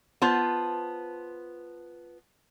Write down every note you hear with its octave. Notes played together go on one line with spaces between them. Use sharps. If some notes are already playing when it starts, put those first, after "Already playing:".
B3 F4 C5 A5